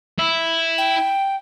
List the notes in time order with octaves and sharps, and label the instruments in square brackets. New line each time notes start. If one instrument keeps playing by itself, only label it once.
[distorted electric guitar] E4
[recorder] G5